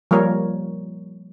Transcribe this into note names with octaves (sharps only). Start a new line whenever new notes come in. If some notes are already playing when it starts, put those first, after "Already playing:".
F3 G3 A#3 A#4 C#5